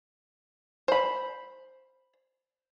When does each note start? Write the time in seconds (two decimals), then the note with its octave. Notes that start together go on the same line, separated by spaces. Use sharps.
0.88 C5 B5